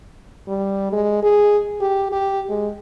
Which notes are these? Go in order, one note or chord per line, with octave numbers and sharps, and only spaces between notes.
G3
G#3
G#4
G4
G4
G#3